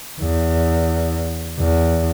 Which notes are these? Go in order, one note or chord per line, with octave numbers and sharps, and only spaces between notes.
E2
E2